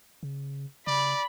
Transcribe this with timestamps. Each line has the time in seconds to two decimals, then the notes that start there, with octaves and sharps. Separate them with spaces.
0.23 C#3
0.87 C#3 D5 B5